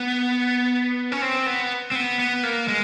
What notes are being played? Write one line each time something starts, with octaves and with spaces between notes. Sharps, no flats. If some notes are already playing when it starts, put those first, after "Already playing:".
Already playing: B3
C#4
C4
B3
C4
B3
B3
A#3
G#3